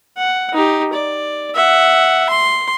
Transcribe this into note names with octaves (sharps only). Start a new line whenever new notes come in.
F#5
D#4 G4
D5
E5 F#5
C6